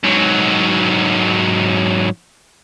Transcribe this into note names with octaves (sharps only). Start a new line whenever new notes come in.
G#2 F#3